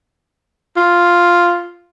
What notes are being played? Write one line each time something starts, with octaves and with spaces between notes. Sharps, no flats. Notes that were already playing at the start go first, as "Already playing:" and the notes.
F4